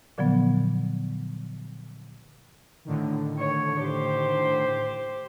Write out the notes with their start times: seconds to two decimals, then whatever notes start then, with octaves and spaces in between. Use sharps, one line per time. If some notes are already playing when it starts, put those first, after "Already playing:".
0.18 A#2 D3 F3 F#3 B3
2.85 A2 D3 D#3
3.38 C#5
3.84 G4 C5